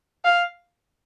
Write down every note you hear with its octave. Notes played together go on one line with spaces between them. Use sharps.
F5